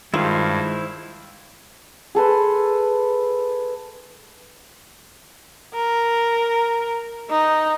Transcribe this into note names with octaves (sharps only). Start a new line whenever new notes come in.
G2 D#3 G#3 E4 F4 C5 F5
G#4 A4 B4 C6
A#4
D#4